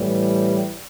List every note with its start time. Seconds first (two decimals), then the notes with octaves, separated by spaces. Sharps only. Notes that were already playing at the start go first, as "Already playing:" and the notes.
Already playing: A2 E3 G3